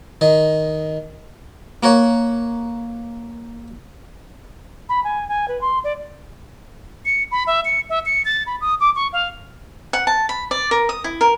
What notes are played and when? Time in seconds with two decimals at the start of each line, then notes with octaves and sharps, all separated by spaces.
0.21 D#3 D#5
1.83 A#3 A#4 C#5 F#5
4.89 B5
5.04 G#5
5.29 G#5
5.48 B4
5.61 C6
5.84 D5
7.05 C#7
7.31 B5
7.47 E5
7.65 C#7
7.89 E5
8.06 C#7
8.25 A6
8.47 B5
8.61 D#6
8.80 D6
8.96 C#6
9.13 F5
9.93 F#5
10.07 A5
10.29 B5
10.51 D5
10.71 A#4
10.89 D#6
11.04 E4
11.21 A#4